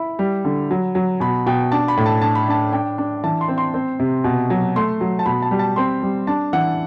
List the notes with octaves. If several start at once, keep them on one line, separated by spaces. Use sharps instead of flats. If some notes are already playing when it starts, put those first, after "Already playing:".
Already playing: E4 B5
G3
D3
F#3
F#3
B2 B5
B2 G5
D4 A5
B5
A2
A5
D4 A5
B5
D4 A5
D4 G5
D4
E3 A5
C6
C4
C6
C4
C3
B2
F#3
A3 C6
F#3
A5
B2 B5
A5
G3
A5
C4 C6
G3
D4 A5
E3 F#5